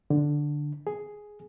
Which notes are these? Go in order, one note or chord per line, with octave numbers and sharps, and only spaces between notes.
D3
G#4